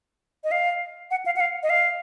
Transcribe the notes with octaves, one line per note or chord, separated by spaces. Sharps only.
D#5
F5
F#5
F5
F#5
F5
D#5
F5